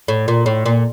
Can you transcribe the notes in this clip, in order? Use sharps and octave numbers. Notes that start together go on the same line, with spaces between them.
A2
A#2
A2
A#2